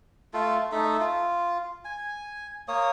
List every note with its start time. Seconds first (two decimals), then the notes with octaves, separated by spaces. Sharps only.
0.34 A3 F4 A4
0.72 A3 D#4 A4 E5
1.00 F4
1.85 G#5
2.68 A#3 C#5 D#6